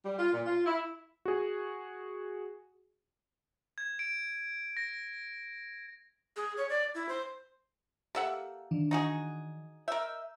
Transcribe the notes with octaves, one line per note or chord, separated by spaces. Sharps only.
G3
F4
A#2
F4
E4
F#4 G#4
G#6
D7
A#6
G#4
C#5
D5
E4
C5
A#3 G4 A4 E5 F#5
D#3 E3 D4
D#4 F#4 G#4
A#4 D#5 E5 E6 G6